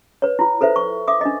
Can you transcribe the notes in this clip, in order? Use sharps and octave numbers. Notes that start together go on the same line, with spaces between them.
B4 C#5
E4 F4
A4 B4 C5 E5
C#6
E5 D6 D#6
D4 D#5